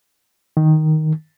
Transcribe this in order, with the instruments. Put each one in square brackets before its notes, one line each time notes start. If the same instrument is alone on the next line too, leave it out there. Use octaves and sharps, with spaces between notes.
[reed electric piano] D#3